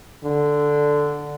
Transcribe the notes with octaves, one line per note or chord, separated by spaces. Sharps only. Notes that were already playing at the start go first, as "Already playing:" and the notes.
D3